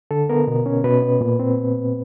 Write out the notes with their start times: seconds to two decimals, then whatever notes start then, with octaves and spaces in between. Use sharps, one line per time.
0.11 D3 A4
0.30 B3 A#4
0.47 B2
0.66 C#4
0.84 B2 B4
1.02 B3
1.21 A#2
1.39 C4